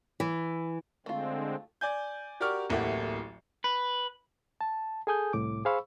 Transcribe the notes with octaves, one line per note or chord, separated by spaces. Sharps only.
E3
D3 G#3 A3 C4 F4
D5 G#5 G6
F#4 G4 A#4 D5 C#6 F6
D1 A1 A3 A#3 G4 F#5
B4
A5
G#4 A4 G#5 D#6 G6
C2 A2 D6
G#4 C5 F5 B5 C#6 E6